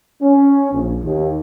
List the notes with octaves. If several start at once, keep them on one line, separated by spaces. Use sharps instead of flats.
C#4
A#1
D#2